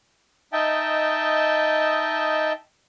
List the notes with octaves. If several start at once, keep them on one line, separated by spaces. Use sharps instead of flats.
D#4 D#5 E5 G5 A5